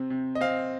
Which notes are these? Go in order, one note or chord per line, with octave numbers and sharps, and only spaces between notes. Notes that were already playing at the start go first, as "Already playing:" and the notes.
Already playing: C3 C4
C3
D#5
C4 F5